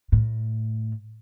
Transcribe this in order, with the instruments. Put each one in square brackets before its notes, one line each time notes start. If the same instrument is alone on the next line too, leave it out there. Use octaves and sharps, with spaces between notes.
[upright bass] A2